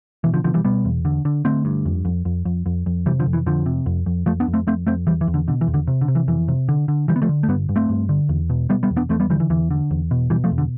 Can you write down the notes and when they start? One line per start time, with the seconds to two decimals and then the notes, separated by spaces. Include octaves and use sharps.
0.24 B2 E3
0.34 D3 F3
0.44 B2 D3 F3
0.54 E3 G3
0.65 B2 G3 B3
0.85 E2
1.05 D3
1.25 D3
1.45 D3 A3 C4
1.65 G2
1.86 F2
2.05 F2
2.25 F2
2.45 F2
2.66 F2
2.86 F2
3.06 C3 E3 G3
3.20 D3 F3
3.26 F2
3.33 E3
3.46 F2 D3 F3
3.66 C3
3.86 F2
4.06 F2
4.26 F2 F3 A3
4.40 B3 D4
4.47 F2
4.54 A3 C4
4.67 F2 A3 C4
4.87 F2 A3 C4
5.07 E2 E3 G3
5.21 E3
5.27 E2
5.34 D3
5.48 B2 D3
5.61 E3
5.68 E2
5.74 D3
5.88 C3
6.01 D3
6.08 C3
6.15 E3
6.28 F2 E3
6.48 C3
6.69 D3
6.88 D3
7.08 D3 E3 G3
7.16 B3
7.22 F3 A3
7.29 D3
7.43 A3
7.48 G2 G3 B3
7.69 G2
7.76 A3 C4
7.89 G2
8.09 D3
8.29 E2
8.50 B2
8.69 B2 G3 B3
8.83 G3 B3
8.90 E2
8.97 B3 D4
9.09 E2 A3 C4
9.20 G3 B3
9.30 D3 E3 G3
9.40 E3
9.50 E2 E3
9.71 D3
9.91 E2
10.11 B2
10.30 B2 E3 G3
10.44 F3 A3
10.51 E2
10.58 D3